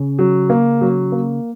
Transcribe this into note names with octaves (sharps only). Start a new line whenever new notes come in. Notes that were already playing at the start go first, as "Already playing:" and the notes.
Already playing: C#3 C#4
F#3
A#3
F#3
A#3